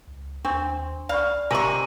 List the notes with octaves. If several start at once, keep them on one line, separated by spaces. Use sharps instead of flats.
C#2
D#2 C4 D4 C#6
C2 D5 F5 B5 C#6
F1 C3 A#4 D#5 G#5 C#6 F#7